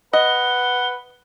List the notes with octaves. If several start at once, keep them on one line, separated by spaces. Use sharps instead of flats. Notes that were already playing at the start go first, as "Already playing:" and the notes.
B4 D#5 F#5 G7